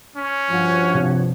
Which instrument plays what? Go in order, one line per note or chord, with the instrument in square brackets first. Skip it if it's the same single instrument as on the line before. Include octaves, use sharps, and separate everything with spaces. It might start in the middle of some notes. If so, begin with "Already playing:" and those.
[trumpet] C#4
[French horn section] G2 F3 [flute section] F#4 C#5
[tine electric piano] C3